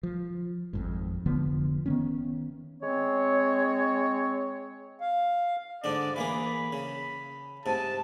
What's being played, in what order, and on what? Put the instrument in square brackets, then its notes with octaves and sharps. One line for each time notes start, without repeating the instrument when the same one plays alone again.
[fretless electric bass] F3
G#1 F2 G#2
F1 D3 F3 B3
D#3 B3 C#4
[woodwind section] G#3 C4 C#5
[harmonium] F5
[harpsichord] G#2 D3 D4 [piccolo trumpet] D5
[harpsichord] E3 A#3 G#4 [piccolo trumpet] B5
[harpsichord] C#3
[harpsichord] G#2 C3 [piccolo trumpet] A5